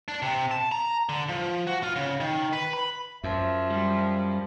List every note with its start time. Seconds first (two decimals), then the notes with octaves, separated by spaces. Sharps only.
0.08 D4
0.22 C3
0.51 A5
0.72 A#5
1.09 D3
1.29 F3
1.67 F#4
1.83 F4
1.96 C#3
2.20 D#3
2.53 B4
2.73 B5
3.24 F#2 F3 E5
3.70 G3